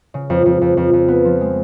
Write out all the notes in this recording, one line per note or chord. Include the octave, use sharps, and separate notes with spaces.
C#3
F2
F2
F2
F2
F2
B3
F3
G#3